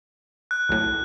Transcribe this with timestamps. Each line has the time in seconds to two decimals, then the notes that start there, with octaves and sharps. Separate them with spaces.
0.51 F#6
0.69 B1 A2